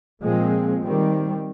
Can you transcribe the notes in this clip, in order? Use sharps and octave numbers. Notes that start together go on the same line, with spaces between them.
A#2 F3 G#3 C4
D#3 G3 C4